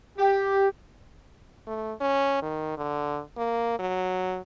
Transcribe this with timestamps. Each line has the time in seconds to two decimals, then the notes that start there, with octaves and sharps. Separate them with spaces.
0.18 G4
1.67 A3
2.01 C#4
2.42 D#3
2.78 D3
3.37 A#3
3.79 F#3